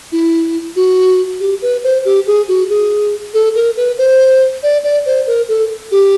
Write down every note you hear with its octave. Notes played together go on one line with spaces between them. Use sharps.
E4
F#4
G4
B4
C5
G4
G#4
F#4
G#4
A4
A#4
B4
C5
D5
D5
C5
A#4
A4
G4